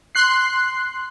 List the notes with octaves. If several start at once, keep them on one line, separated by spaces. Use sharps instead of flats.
C6 F#6 C7